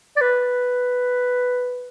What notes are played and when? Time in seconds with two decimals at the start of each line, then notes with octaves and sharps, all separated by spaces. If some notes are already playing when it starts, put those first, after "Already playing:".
0.17 D5
0.21 B4